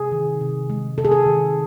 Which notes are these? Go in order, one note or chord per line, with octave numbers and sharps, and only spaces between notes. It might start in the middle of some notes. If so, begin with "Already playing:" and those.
Already playing: C3 G#4
D#3
C3
G#3
C3 A4
G#4
A4
D#3